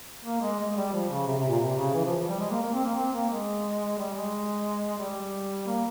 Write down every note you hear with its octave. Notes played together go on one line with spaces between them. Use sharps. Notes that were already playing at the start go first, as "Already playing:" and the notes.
A#3
G#3
G#3
G3
F3
C#3
C3
C3
A#2
C3
C#3
E3
F3
F3
G3
G#3
A#3
A#3
C4
A#3
C4
A#3
G#3
G3
G#3
G3
A#3